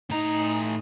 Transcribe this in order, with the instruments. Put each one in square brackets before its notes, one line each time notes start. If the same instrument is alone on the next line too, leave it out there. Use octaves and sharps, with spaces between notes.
[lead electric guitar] A2 A#5 [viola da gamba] D#4